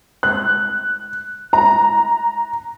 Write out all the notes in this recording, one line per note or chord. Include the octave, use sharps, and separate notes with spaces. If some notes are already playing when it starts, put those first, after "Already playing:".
F#6
A#5